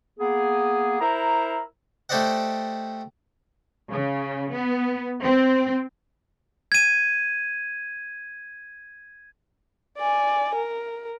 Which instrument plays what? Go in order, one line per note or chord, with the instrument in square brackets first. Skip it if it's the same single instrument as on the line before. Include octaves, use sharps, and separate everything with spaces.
[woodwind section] A#3 B3 G#4
E4 A#4 C5 A#5
[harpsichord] A3 G4 C5 D5 D#5 F#5
[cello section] C#3
B3
C4
[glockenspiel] G#6 D#7
[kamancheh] D5 G#5
A#4